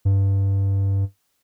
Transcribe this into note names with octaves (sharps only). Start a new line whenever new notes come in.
G2